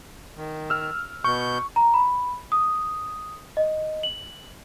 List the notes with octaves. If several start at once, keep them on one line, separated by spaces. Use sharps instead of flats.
D#3
E6 F6
B2 C#6 G6
A#5
B5
D#6
D#5
F#7